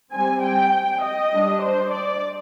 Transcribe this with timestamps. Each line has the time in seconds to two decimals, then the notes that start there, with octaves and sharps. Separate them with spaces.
0.13 G3 C4 G#5
0.43 G5
1.03 D#5
1.32 G3 D4
1.63 C5
1.92 D5